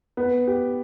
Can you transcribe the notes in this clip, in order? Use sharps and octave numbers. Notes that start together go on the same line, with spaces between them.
B3
G4